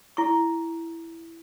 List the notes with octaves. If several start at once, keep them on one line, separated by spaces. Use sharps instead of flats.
E4 C#6